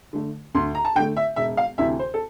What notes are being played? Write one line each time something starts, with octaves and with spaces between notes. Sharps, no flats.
D3 A3
D2 C6
A#5
A5
D3 A3 G5
E5
E1 E5
F5
D2 C3 E3 E5
C5
A4